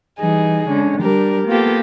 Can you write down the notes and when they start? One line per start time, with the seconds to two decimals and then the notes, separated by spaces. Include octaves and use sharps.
0.19 E3 G3 D#4 G#4
0.69 D3 G#3 C#4
1.02 G3 D4 G4 A#4
1.47 A#3 B3 F4 G4 A4